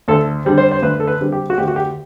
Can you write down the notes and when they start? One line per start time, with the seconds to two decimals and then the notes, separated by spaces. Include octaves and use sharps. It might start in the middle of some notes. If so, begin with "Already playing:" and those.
0.08 D2 A4
0.45 D3 G3 C4
0.58 C5
0.72 C5
0.82 D2 B4
1.00 A4
1.07 B4
1.20 D3 G3 C4
1.32 G4
1.50 F#4
1.58 D2 G4
1.68 F#4
1.76 G4